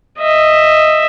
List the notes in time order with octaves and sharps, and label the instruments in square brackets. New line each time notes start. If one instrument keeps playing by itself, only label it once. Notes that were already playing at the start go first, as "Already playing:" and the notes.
[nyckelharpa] D#5 E5